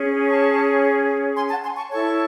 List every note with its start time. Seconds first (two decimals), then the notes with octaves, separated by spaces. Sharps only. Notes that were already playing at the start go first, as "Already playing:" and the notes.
Already playing: C#4 G#4 C#5
0.27 A5 C#6
1.35 G#5 C6
1.50 F#5 A5
1.63 G#5 C6
1.76 A5 C#6
1.90 E4 A4 C#5 A5 C#6